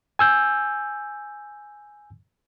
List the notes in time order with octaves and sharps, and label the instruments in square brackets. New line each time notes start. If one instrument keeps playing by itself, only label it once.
[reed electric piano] G#5 E6 G6